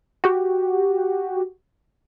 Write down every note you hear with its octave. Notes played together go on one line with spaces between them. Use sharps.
F#4 G4